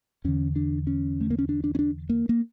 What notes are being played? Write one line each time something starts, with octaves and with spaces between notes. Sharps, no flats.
E2 D3 C#4
D4
C#4
A3
A#3
C#4
D4
D4
C#4
D4
A#3
A#3